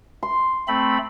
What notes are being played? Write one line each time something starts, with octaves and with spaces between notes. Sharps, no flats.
C6
A3 C4 B5